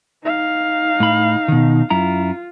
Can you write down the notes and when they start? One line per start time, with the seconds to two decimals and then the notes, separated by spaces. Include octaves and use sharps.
0.23 D#4 F5
1.00 A2 B5
1.48 B2 D#3
1.90 F#2 E4 F4 A#5